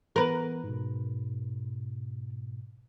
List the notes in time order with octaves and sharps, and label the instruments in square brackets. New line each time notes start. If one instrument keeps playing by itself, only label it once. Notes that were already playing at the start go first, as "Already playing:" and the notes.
[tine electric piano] E3 B3 [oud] A#4 B4
[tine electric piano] G#2 B2